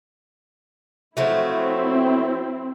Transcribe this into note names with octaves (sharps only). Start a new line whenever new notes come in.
F3 F#3 A3 C4 E4